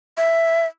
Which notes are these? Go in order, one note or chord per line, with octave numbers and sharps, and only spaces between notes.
E5